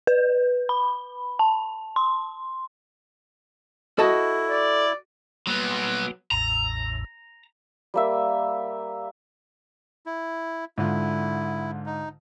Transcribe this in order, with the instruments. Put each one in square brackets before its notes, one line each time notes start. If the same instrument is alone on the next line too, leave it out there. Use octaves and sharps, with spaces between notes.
[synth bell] B4
B5
A5
C6
[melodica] E4 [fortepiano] F#4 D#5 [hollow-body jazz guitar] A4 A5
[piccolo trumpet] D5
[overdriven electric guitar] F#3 B3 [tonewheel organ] G3 A#3
[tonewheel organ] A1 E2 A2 [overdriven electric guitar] A#5
[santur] G3 A#3 E5
[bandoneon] E4
[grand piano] G#2 D3 F4 [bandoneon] E4
[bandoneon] D#4